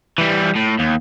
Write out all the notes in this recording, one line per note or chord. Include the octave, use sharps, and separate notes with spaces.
E3 G3
A2
D#2